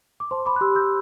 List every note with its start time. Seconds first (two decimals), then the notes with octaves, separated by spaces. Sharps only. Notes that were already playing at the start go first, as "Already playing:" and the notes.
0.20 D6
0.31 C5 A5 C6
0.46 B5 D6
0.56 F#6
0.61 G4 C6 E6
0.75 E6 G6